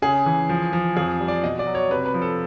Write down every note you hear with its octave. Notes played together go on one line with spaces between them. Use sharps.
C#3 G#4
E3
F3
F3
F2 G#4
G3
D5
B2 D#5
D5
F#3
C#5
C3 B4
B4
F3
A4